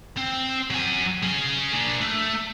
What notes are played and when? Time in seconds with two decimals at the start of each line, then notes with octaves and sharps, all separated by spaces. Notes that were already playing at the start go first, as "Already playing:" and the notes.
0.17 C4
0.70 F#3 G#5
1.23 C#4 G#4
1.73 A#3 D4
2.01 A3